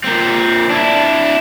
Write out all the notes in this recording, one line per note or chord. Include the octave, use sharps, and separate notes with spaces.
A#2 C4
D4 E4